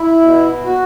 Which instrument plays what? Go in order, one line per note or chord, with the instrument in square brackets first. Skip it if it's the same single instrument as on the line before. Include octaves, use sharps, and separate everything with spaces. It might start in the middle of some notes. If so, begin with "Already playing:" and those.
Already playing: [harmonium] E4
B2
F#4